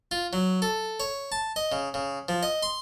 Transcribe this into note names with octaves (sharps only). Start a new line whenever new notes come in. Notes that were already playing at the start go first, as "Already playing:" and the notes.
F4
F#3
A4
C#5
A5
D#5
C#3
C#3
F3
D#5
C6